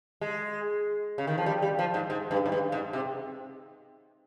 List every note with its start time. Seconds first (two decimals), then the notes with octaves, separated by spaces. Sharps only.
0.21 G#3
1.18 C#3
1.27 D#3
1.38 F3
1.46 G3
1.62 G3
1.79 F3
1.94 G#2
2.10 G#2
2.31 G2
2.46 G#2
2.52 G2
2.72 G#2
2.93 C3